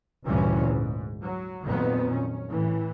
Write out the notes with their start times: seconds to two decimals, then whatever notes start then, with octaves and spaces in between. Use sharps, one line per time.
0.25 F1 D2 G2 A#2 E3 C#4
0.68 G#2
1.22 F#3
1.65 F2 A#2 D#3 F#3 B3
2.11 C#4
2.48 A2 E3